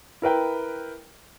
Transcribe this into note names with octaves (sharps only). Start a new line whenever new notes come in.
E4 A#4 B4 G5